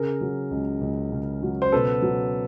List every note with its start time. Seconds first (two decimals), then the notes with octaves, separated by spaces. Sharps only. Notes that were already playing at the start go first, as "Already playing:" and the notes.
Already playing: C#3 G#4 A#4
0.21 F#3
0.51 C#2
0.81 C#2
1.12 C#3
1.42 F#3
1.62 C5
1.72 B2 A4 B4
2.02 F#3